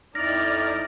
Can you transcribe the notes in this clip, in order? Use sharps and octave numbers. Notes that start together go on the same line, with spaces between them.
F2 D#4 E4 D5 F6 A#6